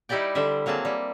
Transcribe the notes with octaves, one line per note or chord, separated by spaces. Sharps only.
G3 D#4 E4 G4 D5 G5
D3 G3 C5 E5
F#3 A#3 C4 G#4 A5
G3